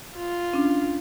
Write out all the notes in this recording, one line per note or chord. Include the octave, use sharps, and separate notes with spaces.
F4
C#4 D4